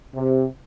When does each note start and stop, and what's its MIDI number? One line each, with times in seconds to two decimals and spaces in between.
0.14 0.46 48